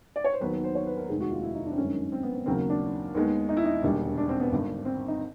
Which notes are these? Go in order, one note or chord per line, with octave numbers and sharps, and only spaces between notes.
D5
C#5
C5
D#2 D#3 F#3 B3 B4
B4
C5
C#5
B4
A#4
F1 D#2 D#3 G#3 G#4
F#4
F4
E4
D#4
D4
C4
G1 F#2 D#3 G#3 C#4
C4
B3
C4
D#2 C#3 F#3 A#3 C4
D4
D#2 D#3 G#3 B3
D#4
E4
D#4
E1 D#2 D3 G3
D4
C4
B3
G#1 G2 D3
C4
D#4